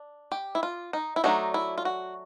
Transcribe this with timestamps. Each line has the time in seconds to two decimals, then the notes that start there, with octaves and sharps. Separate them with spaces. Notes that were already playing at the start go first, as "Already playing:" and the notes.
Already playing: D4
0.32 G4
0.55 E4
0.63 F4
0.93 D#4
1.16 E4
1.24 F#3 A3 D4 D#4
1.54 E4
1.78 F4
1.85 F#4